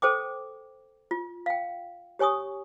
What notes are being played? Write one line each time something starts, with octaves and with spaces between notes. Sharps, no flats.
A4 C5 G5 D6
F4
F5 G5
G4 C#5 G#5 C#6 D#6